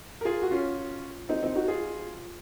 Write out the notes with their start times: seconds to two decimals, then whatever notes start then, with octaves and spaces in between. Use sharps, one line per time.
0.21 A#4
0.25 F4 G#4
0.42 F#4
0.51 C#4 F4
1.29 C4 D#4
1.43 C4 D#4
1.55 D#4 F#4
1.68 F4 G#4